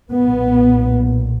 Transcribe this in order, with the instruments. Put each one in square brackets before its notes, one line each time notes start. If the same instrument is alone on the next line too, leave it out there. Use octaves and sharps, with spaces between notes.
[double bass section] B1 A#2 B3